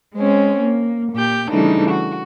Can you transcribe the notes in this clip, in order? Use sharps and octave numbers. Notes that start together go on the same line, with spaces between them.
G#3 C4 C#4
A#3
A#2 G4 G6
C#3 E3 G3 A3 D4 D#4
F#4